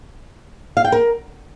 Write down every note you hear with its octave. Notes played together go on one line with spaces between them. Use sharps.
F5
G5
A#4